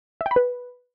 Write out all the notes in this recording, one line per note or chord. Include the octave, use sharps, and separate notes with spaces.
E5
G5
B5
B4